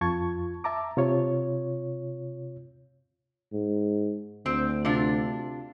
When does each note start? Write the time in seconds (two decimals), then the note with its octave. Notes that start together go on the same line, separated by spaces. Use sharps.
0.01 F2 F4 A5 C#6 G#6
0.64 E5 A5 A#5 D6
0.97 C3 F4 C#5
3.53 G#2
4.46 D2 C4
4.85 C3 D4 F4